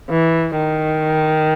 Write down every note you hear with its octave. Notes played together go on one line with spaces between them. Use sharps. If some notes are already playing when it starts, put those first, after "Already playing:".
E3
D#3